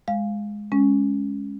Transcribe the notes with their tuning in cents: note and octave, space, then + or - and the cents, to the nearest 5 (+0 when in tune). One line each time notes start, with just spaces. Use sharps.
G#3 +0 F5 +0
G#3 +0 C#4 +5